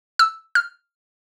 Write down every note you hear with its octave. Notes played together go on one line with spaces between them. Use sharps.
E6
F6